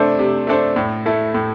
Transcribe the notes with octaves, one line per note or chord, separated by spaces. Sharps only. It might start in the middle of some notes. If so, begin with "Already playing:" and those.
Already playing: C3 A3 D4 A4 C5
C3
A3 D4 A4 C5
A2
A3 E4 A4
A2